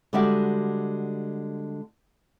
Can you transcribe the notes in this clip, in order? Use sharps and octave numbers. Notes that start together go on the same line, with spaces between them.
D3 G3 G#3 F#4 G4 E5